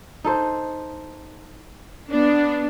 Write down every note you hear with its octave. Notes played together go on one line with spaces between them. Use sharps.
D#4 A4 C5
B3 D4